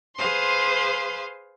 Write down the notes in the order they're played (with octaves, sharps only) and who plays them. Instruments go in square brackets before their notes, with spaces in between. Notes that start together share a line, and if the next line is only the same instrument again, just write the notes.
[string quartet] G#4 B4 C5 F5 C6